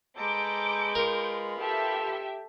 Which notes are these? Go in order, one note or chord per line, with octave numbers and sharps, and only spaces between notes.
G#3 A4 B4 A#5 D6 G6 D7
F4 A#4 B4
G4 A4 E5